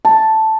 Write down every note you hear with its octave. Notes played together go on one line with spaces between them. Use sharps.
A5